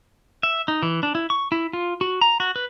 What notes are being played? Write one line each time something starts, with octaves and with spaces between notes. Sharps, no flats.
E5
D#4
E3
D4
E4
C#6
E4
F4
F#4
A#5
F#4
B4